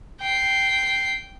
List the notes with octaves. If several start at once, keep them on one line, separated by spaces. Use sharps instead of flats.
G5 C7